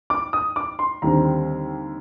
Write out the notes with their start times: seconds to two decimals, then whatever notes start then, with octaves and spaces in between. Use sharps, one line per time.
0.10 D6
0.33 D#6
0.56 D6
0.79 C6
1.02 D#2 D3 G3 C4 A#5